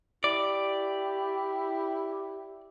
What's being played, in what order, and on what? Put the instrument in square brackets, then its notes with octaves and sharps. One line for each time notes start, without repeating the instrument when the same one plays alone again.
[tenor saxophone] E4 [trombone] G4 [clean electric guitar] D5